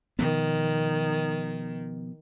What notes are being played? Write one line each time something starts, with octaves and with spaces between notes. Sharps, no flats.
B2 D#3 F3 B3